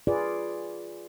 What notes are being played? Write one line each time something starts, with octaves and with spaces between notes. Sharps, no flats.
F4 G#4 B4 D5